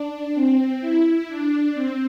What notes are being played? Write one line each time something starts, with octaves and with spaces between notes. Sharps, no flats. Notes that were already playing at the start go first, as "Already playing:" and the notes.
Already playing: D4
C4
E4
D4
C4